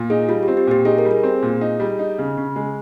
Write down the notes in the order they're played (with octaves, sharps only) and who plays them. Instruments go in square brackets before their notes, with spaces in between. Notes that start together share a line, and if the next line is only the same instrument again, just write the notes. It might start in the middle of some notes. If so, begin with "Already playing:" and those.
Already playing: [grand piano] A#2
[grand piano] D#4 [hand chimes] G#4
[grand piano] G3 [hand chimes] F4
[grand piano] C4 [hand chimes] G4
[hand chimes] G4
[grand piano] A#2 [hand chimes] G4
[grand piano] D#4 [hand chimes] G#4
[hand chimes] A#4
[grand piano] G3
[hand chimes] G#4
[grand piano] C4
A#2
D#4
G3
D#4
C#3
C#3
G#3